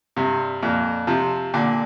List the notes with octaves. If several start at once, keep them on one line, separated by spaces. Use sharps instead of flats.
G2 C3
F2 A#2
C3 F3
A#2 D3